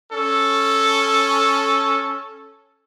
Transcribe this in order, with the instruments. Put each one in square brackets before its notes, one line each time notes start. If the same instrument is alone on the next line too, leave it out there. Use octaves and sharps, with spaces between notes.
[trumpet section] C#4 A4